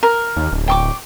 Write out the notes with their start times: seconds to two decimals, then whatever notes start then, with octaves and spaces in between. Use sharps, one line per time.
0.03 A#4
0.37 D#2
0.52 D1
0.68 G5 C#6 D6